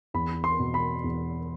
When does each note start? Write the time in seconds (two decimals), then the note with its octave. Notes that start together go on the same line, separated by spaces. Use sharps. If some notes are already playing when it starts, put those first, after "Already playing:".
0.14 E2 B5
0.44 C6
0.59 B2
0.74 B5
1.04 E2